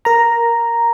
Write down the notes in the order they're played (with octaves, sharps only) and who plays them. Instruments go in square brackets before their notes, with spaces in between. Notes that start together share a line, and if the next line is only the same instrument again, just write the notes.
[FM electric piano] A#4 A#5